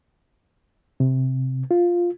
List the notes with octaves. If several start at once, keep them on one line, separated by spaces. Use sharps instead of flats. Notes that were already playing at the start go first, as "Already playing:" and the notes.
C3
F4